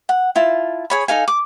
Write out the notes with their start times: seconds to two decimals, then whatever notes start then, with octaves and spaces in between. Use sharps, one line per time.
0.09 F#5
0.36 E4 F4 A5
0.90 G#4 C#5 B5
1.08 D#4 A4 F5 G#5
1.28 D6